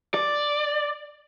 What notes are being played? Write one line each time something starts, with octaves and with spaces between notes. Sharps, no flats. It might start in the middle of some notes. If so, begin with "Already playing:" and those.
D5